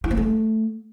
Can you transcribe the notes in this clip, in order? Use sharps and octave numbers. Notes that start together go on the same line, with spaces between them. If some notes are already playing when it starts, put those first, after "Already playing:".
E4
A#3
A3